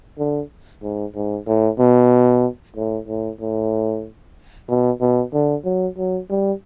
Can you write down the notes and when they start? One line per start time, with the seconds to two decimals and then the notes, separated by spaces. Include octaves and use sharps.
0.18 D3
0.83 G#2
1.15 G#2
1.47 A2
1.79 B2
2.77 A2
3.08 A2
3.41 A2
4.69 B2
5.01 B2
5.33 D3
5.65 F#3
5.98 F#3
6.30 G3